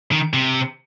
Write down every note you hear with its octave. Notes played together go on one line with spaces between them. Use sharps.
D#3
C3